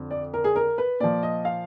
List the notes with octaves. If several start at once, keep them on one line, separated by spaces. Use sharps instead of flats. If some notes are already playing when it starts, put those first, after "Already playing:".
Already playing: F2 D3
D5
A#4
G#4
A#4
B4
A#2 F3 D5
D#5
F5